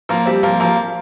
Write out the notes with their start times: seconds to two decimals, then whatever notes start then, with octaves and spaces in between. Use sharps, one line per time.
0.09 F3 A#3
0.26 G3 C4
0.43 F3 A#3
0.60 F3 A#3